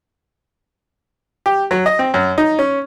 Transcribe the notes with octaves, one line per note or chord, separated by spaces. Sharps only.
G4
F#3
D#5
C4
F#2
D#4
C#4